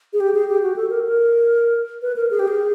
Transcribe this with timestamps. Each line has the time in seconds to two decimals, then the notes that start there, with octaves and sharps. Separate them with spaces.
0.13 G#4
0.20 G4
0.34 G#4
0.49 G4
0.63 F#4
0.76 A4
0.90 A#4
1.05 A#4
2.02 B4
2.16 A#4
2.31 G#4
2.39 G4
2.48 G#4